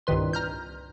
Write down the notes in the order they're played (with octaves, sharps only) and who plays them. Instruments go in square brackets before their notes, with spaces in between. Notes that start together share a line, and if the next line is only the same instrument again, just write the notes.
[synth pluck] C2 G2 A#2 D#3 B4 C6
A#5 F6 G6